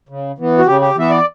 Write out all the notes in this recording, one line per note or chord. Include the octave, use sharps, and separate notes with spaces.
C#3
E3 B3
F#4
C#3 G4
G4
E3 B3 E5
D5